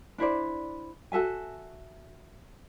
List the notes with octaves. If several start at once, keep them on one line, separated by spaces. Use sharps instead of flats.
D4 E4 C5 D5
F#4 A4 E5 G#5